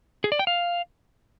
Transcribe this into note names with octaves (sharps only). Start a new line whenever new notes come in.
G#4
D5
G5
F5